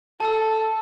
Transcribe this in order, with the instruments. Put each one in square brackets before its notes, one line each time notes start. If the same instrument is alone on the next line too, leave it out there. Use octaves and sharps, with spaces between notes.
[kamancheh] A4 [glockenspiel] A5 E6